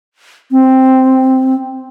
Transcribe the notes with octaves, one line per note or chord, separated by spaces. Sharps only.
C4